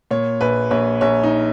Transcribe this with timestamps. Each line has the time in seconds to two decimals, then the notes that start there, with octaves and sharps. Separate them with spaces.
0.11 A#2 C#5
0.41 A#1 B4
0.71 A#1 C#5
1.01 A#1 C#5
1.24 D#4